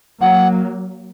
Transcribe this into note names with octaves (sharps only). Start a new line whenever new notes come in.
F#3 A#3 F#5